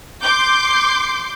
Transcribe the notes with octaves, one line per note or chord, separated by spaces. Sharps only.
C6 D6 G6